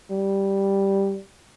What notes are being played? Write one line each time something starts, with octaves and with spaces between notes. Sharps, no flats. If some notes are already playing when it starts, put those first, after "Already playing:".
G3